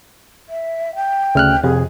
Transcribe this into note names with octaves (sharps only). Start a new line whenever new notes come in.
E5
G5
D2 C#3 F6 F#6
F2 C3 G#4